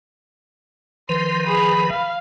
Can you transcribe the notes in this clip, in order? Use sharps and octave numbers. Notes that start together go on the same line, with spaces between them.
D#3 F3 B4 C6
G#4 B5
F5